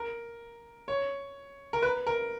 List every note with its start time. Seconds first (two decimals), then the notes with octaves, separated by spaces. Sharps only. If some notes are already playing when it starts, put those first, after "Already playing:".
Already playing: A#4
0.88 C#5
1.73 A#4
1.82 B4
2.07 A#4